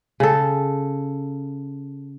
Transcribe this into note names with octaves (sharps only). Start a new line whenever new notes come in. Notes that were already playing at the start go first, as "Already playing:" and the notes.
C#3 A4